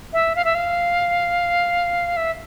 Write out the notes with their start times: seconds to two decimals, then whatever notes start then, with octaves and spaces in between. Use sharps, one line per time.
0.13 E5
0.36 F5
0.45 E5
0.55 F5
2.17 E5